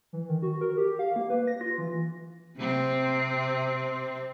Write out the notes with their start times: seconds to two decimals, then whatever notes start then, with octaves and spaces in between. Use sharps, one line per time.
0.13 E3
0.28 D#3
0.42 F#4
0.61 A#4
0.77 G4
0.99 F5
1.16 A#3
1.30 B4
1.47 A#6
1.61 F4
1.78 E3
2.57 C3 C4